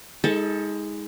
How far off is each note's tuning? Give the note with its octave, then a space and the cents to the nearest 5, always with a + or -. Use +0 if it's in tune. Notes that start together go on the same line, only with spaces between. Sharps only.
G#3 -10 D#4 +35 A4 +0